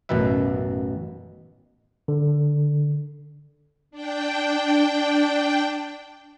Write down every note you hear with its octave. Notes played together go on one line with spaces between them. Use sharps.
A1 F#2 B2 D#3 B4 E5
D3
D4 G5